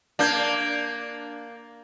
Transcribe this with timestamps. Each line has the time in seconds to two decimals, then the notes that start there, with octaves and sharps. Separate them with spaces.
0.19 A#3 D4 A5 G6 G#6